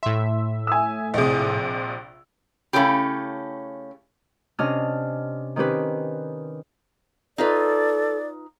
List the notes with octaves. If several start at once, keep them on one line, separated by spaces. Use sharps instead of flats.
A2 E5 C6
G#5 D#6 E6
A#1 C3 G#4 D#5
C#3 G3 A3 C#4 E4 G4
C3 C#4 D4 D#5 F6
D#3 C4 C#4 G4 B4
D#4 F4 A4 B4 D5